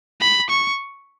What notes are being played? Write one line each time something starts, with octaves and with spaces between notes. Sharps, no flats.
B5
C#6